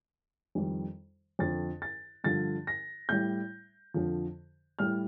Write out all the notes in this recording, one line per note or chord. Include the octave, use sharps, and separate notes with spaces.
F2 D#3 G3
F2 D3 F3 A6
A6
G2 D3 F3 A6
A#6
A2 G3 G6
F2 D3 F3
A2 G3 F6